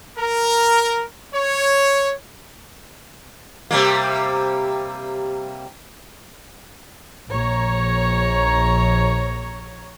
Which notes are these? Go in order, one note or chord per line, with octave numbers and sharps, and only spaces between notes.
A#4
C#5
C3 G3 A#3
A#1 C#5 A#5